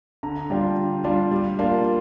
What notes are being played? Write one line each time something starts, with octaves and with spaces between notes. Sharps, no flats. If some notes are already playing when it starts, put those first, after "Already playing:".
D3 A#5
G3 D4 F4 G5
D3
G3 D4 F4
G3
A#3 D4 F4